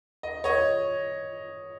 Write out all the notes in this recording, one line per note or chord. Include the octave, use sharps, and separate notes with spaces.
D#5
C#5 D#5